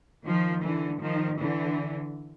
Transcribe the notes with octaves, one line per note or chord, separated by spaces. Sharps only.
D#3 F3
D3 E3
D#3 F3
D3 E3